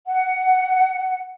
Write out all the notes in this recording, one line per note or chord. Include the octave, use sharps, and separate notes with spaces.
F#5